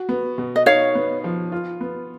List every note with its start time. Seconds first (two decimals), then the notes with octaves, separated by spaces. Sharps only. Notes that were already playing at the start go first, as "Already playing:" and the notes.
Already playing: F#4
0.09 B3
0.38 B2
0.56 D#5
0.66 D#4 C#5 F5
0.95 B3
1.24 F3
1.52 F4
1.81 B3